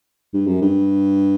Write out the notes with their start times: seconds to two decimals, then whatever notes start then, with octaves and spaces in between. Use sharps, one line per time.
0.33 G2
0.47 F#2
0.62 G2